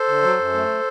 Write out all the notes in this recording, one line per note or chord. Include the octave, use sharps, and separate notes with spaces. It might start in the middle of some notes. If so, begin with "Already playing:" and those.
Already playing: A4 C5
D3
F#3
F#2
A3